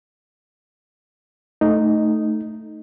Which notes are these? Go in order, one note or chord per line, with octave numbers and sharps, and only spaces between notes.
A3 D#4